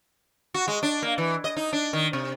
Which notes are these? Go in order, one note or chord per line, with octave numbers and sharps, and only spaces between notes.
F#4
G#3
D4
A#3
E3
D#5
D#4
D4
D#3
C3